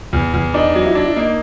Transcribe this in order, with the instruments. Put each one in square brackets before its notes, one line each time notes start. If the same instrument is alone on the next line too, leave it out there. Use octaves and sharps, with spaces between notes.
[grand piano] E2
E2
[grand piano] D4 [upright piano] D#4
[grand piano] F#3
[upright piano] E4
[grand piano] D4
[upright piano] E4
[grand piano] A#3 [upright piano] D#4